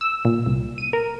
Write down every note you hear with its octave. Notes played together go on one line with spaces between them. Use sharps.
E6
A#2
C2
D#7
A#4